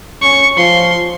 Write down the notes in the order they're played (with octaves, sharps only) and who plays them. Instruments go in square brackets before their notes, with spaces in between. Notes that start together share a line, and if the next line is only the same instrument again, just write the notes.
[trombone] C#4 [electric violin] C#6
[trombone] F3 [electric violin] C6